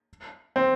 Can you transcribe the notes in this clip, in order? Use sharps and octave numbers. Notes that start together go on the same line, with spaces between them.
C4